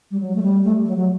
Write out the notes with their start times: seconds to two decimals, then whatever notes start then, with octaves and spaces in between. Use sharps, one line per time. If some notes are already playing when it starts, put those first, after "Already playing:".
0.11 G3
0.20 F#3
0.35 A3
0.42 G3
0.64 A3
0.86 F#3
0.97 F#3